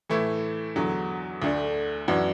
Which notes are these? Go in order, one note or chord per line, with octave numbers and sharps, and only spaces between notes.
A2 E3 A3 E4
E2 D3 F#3
D2 D3 A3 D4
F#2 E3 D4 F#4